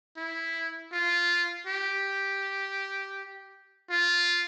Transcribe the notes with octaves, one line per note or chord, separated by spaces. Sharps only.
E4
F4
G4
F4